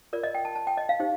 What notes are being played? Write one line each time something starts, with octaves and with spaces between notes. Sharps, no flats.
F4 A#4 D5
D#5
G5
A5
A5
G5
D#5
F5
D#4 G4 C5